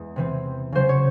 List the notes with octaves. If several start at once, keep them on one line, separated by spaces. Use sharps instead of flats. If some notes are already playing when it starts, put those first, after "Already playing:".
Already playing: E2 G#3
C3 E3 C4
C#3 F#3 C#4 C5
C#5